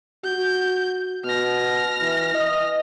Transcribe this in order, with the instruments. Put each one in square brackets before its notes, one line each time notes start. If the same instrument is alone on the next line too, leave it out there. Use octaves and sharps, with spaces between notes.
[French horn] F#4 [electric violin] G6
[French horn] B2 [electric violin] F6 A#6
[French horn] E3
D#5